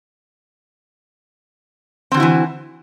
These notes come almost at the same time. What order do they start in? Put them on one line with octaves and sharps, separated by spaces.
C4 D3 F#4 E4 E3